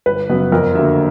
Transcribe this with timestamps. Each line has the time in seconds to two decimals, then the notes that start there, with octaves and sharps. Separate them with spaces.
0.06 G1 B4
0.29 F#2 C#3 F#3 B3
0.52 F2 A#4
0.75 D3 F#3 A#3 E5